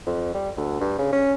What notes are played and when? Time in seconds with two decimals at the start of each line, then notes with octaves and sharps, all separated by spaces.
0.06 F2
0.34 G3
0.57 D2
0.81 G2
0.99 C#3
1.13 C#4